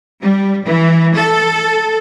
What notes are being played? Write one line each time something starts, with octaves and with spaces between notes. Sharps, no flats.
G3
E3
A4